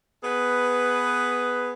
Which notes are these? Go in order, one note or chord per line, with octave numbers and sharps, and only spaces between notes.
B3 G#4 B4